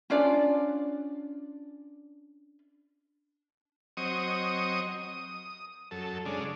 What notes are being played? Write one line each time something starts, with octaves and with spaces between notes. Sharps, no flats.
C#4 D4 F4 D5
F#3 C4 D#5 C#6 D#6
D#6
F#2 A4
C#3 G#3 D4